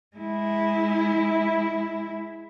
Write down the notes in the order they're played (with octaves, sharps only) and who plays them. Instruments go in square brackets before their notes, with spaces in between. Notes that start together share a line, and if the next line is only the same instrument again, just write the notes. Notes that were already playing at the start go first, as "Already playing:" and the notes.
[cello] G#3 E4